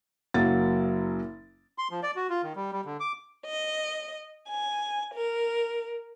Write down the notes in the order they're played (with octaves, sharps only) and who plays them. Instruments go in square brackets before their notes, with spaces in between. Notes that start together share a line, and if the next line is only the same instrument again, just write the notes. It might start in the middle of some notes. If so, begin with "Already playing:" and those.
[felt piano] F#1 F#3 A#3 A6
[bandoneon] C6
F3
D5
F#4
F4
D#3
G3
G3
D3
D6
[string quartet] D#5
G#5
A#4